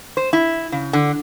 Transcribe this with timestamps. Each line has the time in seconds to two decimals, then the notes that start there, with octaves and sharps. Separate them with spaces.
0.17 C5
0.33 E4
0.72 C#3
0.93 D3